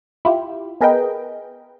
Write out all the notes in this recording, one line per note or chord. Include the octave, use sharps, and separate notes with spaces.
E4 F4 G4
B3 G#4 A#4 B4 D#5 G5